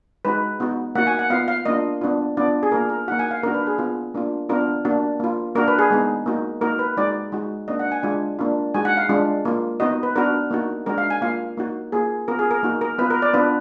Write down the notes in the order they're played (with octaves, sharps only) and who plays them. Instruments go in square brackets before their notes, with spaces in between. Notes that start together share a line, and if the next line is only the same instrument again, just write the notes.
[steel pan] G#3 D#4 F#4 B4
B3 D#4 F#4
A#3 D#4 F#4 F#5
G#5
F#5
B3 F4 F5
F5
A#3 D4 F4 D#5
B3 D4 F4
B3 D4 F4 D5
G#4
A#3 F4 A#4
A#4
A#3 D#4 F#4 F#5
G#5
F5
A#3 D4 F#4 A#4
B4
G#4
B3 F4
A#3 D4 F4
B3 D4 F4 A#4
A#3 D4 F#4
A#3 F4
A#3 D4 F#4 A#4
B4
G#4
G#3 B3 D#4
A#3 D#4 F#4
A#3 D#4 F#4 A#4
B4
G#3 D#4 F#4 D5
G#3 D#4 F#4
A#3 D4 F#4 D#5
F#5
G#5
G#3 D4 F4 G#5
A#3 D4 F4
G#3 D#4 F#4 G#5
F#5
F5
G#3 D4 F4
A#3 F4
B3 D#4 F#4 D#5
B4
B3 D4 F#4 A#4
A#3 D#4 F#4
G#3 D4 F#4 A#4
F5
G#5
A#3 F4 F5
A#3 D#4 F#4
A#3 F4 G#4
B3 F4 A#4
G#4
A#4
A#3 D#4 F#4
A#4
B3 F4 B4
A#4
D5
B3 D4 F4 B4